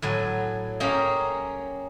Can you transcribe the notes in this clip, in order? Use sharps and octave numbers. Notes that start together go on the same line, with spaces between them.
A2 F#3 G#5
A#3 C#4 G4 G#4 A#5